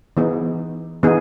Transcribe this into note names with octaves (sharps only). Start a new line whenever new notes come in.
E3 B3 D#4 G#4
E3 B3 D#4 G#4